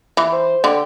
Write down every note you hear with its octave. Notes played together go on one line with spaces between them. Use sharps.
E3
C5
D3 G5